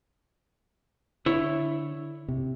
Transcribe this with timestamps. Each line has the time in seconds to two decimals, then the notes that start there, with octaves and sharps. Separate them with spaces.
1.26 D3 E4 C#5
2.28 C3